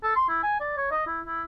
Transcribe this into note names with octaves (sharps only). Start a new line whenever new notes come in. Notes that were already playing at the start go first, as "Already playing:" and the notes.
A4
C6
E4
G#5
D5
C#5
D#5
E4
E4